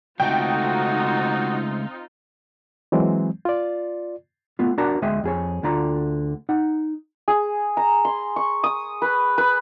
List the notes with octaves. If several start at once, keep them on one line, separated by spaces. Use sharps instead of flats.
C#2 A3 C4 D#4 F4 F#4 G5
E3 F#3 G#3 C4
F4 D5
A3 B3 F4
D4 F#4 A#4 D5 A5 A#5
D2 G#3 D#5 E5 G5
F2 G#4 C#5
D2 D3 F4 D5 A#5
D#4 F#5
G#4
A#5
C6
C#6
D#6
B4
B4